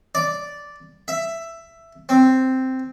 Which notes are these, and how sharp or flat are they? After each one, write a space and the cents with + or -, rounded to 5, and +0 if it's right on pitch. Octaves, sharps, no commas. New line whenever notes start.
D5 -5
E5 +10
C4 -5